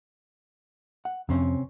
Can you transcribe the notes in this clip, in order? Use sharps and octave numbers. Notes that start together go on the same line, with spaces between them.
F#5
F2 C3 C4 C#4